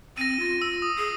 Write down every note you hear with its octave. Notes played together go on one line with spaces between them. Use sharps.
C4 A#6 D#7
F4
E6
D#6
G#4